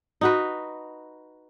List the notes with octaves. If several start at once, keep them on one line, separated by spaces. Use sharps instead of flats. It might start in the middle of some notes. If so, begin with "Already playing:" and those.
D#4 F#4 B4